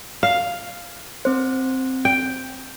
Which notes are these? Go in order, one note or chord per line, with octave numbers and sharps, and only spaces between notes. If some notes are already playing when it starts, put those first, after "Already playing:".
F5
C4 C5
G5